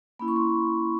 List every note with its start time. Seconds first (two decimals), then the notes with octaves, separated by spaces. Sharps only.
0.19 A#3 C#4 E4 B5
0.28 C#6
0.36 C6